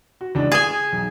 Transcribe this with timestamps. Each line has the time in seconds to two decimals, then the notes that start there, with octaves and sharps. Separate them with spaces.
0.21 F#4
0.35 C#2 D4 E4
0.52 G#4 G#5 D#6 E7
0.92 B1